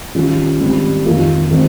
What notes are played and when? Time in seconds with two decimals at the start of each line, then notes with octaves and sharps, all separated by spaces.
0.15 D#3 G3 C#4 F4
0.60 G#2 D#3 G3 C4
1.05 F2 D#3 A#3 F4
1.51 D#3 G#3 C4